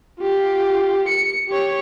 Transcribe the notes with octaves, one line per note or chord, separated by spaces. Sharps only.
F4 G4
C#7
G4 C#5